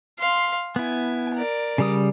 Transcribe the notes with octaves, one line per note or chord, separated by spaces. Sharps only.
F5 C6
B3 E4 G#5
A#4 D5
C#3 G3 D#6